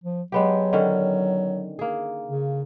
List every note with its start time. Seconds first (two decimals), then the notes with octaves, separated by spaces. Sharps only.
0.04 F3
0.32 F#3 G#3 B3 G4
0.73 D3 D#3 C#4
1.79 A#3 G#4
2.28 C#3